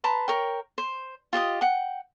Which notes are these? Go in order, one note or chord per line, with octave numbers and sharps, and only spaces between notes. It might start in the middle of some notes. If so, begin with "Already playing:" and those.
B4 A5 A#5 C6
A#4 C#5 G5
C5
F4 G4 D#5 D#6
F#5 G5